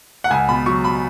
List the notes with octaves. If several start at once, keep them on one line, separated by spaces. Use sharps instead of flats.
F#5
C#2 G#5
B2 B5
F#3 C#6
B5